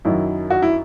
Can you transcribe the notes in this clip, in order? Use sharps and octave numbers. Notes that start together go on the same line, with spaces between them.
F#2 D#3 F#3 E4
F#4
E4